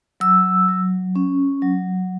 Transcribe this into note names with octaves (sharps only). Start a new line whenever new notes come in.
F#3 E6
F#3
C#4
F#3